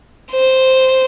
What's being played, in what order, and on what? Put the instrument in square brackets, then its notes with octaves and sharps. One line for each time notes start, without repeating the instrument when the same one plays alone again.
[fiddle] C5